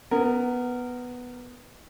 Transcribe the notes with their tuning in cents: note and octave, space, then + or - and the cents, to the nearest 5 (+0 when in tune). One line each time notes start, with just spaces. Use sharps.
B3 +0 A#4 -15